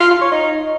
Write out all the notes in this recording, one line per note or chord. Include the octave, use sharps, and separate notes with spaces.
F4
F4
C#5
D#4